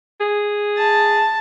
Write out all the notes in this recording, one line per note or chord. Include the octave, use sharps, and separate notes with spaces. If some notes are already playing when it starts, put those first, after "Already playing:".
G#4
A5